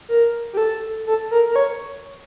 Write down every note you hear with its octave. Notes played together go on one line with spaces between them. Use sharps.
A#4
G4
A4
A4
A#4
A#4
C#5